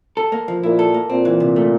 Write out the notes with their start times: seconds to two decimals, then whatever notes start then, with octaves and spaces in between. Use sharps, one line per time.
0.17 A4
0.32 A#3
0.48 F3
0.63 A#2 E4
0.79 A4
0.94 A#3
1.10 A#2 C4
1.25 E3
1.40 C3
1.56 A3